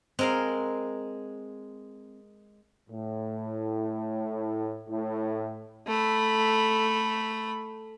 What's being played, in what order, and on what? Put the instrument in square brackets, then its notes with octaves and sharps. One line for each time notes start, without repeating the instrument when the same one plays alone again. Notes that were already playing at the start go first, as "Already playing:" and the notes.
[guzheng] G#3 A#4 F5 [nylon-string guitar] C4
[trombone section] A2
A2
[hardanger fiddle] A3 B5